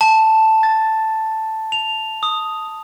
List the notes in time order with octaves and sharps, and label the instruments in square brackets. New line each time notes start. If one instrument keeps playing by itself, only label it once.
[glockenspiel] A5
A6
F7
D#6